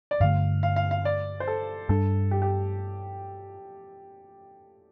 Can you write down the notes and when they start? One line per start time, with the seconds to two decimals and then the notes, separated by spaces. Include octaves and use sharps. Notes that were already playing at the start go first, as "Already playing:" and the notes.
0.11 D5
0.20 G2 D3 A3 F5
0.63 F5
0.76 F5
0.91 F5
1.05 D5
1.40 C5
1.47 A4
1.89 G2 G3 D4 A4
2.31 G4
2.42 G4